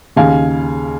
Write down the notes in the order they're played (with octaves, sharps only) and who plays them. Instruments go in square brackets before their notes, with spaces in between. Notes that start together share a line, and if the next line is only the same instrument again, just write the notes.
[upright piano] D#2 C#3 F5 G#5